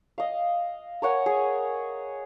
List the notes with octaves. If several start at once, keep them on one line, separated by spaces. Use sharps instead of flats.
D#5 F5
A#4 C#5 F#5 G#5
G#4